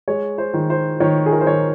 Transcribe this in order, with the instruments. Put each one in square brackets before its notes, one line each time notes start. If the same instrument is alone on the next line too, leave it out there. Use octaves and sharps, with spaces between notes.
[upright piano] G#3 C#5
C5
D#3
C5
D#3 C#5
G#4
A#4
C5
D#3 C#5